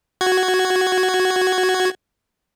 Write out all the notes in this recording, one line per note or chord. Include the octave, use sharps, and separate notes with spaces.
F#4 G#6